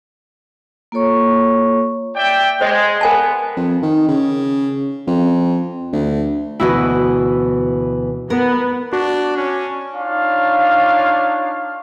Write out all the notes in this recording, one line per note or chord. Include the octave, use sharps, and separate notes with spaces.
A#3 F4 A4 C#5 C#6
D5 E5 G5
G#3 C5 D#5 D#6
B3 A#4 G#5 A5
F2
D#3
C#3
F2
D2
D2 B2 E3 E4 F#4 D#5
B3 A#4
D4 F#4
C#4
D4 D#4 F4 C#5 F5